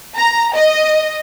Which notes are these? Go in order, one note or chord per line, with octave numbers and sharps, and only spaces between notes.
A#5
D#5